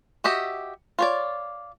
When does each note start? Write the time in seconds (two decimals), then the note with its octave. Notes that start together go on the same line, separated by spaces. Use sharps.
0.24 F#4 G4 D#5 E5
0.99 F4 C#5 D5